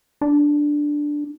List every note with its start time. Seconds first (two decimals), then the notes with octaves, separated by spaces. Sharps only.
0.21 D4